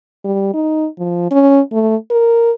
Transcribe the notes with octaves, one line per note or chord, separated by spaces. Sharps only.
G3
D#4
F3
C#4
A3
A#4